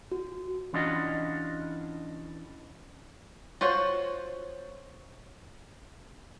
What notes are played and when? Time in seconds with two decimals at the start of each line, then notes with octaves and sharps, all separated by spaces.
0.12 F#4
0.73 E3 C#4 D4 F4 F#4 D#5
3.61 F4 F#4 C5 C#5